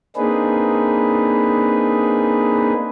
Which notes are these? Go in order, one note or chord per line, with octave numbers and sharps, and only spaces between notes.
A#3 C4 D4 D#4 G#4 B4